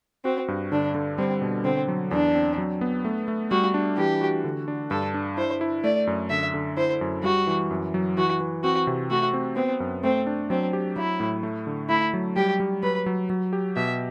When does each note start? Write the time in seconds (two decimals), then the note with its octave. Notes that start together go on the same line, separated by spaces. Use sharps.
0.24 C4 F#4
0.48 G2
0.72 D3 D4
0.95 D3
1.18 G3 C4
1.42 B2
1.64 D3 C4
1.88 F#3
2.11 E2 D4
2.35 C4
2.58 F#3
2.81 B3
3.05 A3
3.28 A3
3.51 G3 F#4
3.74 D4
3.97 E3 G4
4.21 F#4
4.44 D3
4.68 D4
4.90 G2 A4
5.14 D4
5.37 E4 C5
5.61 E4
5.84 A3 D5
6.07 F#2
6.30 D3 E5
6.54 D3
6.77 E4 C5
7.01 F#2
7.24 G3 F#4
7.47 E3
7.71 F#2
7.94 F#3
8.17 E3 F#4
8.40 E3
8.63 C4 F#4
8.87 C3
9.10 A3 F#4
9.34 C4
9.56 B3 C4
9.80 F#2
10.03 A3 C4
10.27 D4
10.50 F#3 C4
10.73 G4
10.96 F#3 E4
11.20 A2
11.43 A3
11.67 D3
11.89 A3 E4
12.13 F#3
12.36 G3 G4
12.60 G3
12.83 F#3 B4
13.06 F#3
13.30 F#3
13.53 G4
13.76 B2 E5